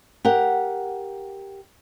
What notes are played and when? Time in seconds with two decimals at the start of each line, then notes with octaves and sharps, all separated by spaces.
0.25 G4 A#4 F#5